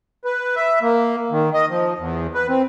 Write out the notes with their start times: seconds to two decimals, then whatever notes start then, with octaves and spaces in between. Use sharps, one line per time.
0.25 B4
0.56 E5
0.82 A#3
1.31 D#3
1.54 D#5
1.70 F3
1.98 E2
2.34 B4
2.48 C4